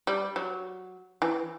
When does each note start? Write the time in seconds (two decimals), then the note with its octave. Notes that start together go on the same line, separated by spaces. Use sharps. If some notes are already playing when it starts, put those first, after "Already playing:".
0.07 G3
0.36 F#3
1.22 E3